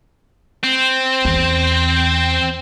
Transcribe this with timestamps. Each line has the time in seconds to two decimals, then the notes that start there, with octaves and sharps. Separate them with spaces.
0.63 C4
1.25 E2